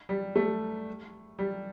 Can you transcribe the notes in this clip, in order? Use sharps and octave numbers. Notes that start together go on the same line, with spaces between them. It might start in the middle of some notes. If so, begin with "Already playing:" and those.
G3
A3
G3